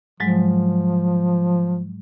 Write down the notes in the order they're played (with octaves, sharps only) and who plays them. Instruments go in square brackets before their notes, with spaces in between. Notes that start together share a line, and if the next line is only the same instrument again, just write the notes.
[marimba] G#2 F#3 G#3 [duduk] F3